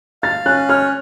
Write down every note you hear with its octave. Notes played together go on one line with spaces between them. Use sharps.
F5 A6
C#4 F#6
C#5 F6